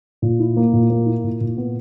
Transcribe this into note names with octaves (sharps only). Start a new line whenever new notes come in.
A#2
E4
A#3
A#2
A#3
E4
A#2
A#2
B3